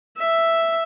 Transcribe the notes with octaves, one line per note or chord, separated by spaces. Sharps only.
E5